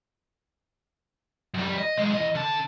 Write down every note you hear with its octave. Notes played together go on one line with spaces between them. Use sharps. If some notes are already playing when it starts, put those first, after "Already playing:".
F#2 G3
D#5
B1 G#3
E2 D#5
D3 A5